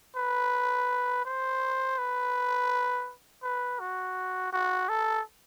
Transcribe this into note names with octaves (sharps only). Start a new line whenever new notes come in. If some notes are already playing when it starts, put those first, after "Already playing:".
B4
C5
B4
B4
F#4
F#4
A4